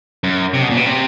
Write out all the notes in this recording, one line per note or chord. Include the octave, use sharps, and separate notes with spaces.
F#2
C3
B2
A#2
B2
C3